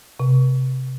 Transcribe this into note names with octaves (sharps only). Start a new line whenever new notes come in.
C3